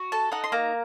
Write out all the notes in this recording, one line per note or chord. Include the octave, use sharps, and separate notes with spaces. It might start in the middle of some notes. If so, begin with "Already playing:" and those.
Already playing: F#4
A4 A5
D#4 F#5
C6
A#3 A#5